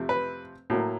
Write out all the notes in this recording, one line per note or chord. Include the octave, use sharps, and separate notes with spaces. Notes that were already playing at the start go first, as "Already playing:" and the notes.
Already playing: F2 C3 F3 A3 C4
B4
A2 F#3 A#3